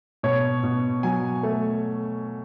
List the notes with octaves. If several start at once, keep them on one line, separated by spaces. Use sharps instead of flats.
B2 C#5
B2
F#3 G#5
A3